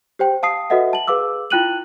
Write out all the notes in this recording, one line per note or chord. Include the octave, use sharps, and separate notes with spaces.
G4 C5 G5
F5 A5 D#6 C7
F#4 A4 B4 D#5 E5 F#5
A5 F#7
G#4 B4 F5 D6 E6
E4 F4 G5 F#6 D#7 F#7